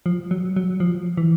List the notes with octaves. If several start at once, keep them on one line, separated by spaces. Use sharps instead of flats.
F3
F#3
F#3
F3
E3